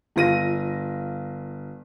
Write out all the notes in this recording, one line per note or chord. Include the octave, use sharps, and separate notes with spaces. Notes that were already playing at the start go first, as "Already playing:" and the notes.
G1 F4 A#6 D#7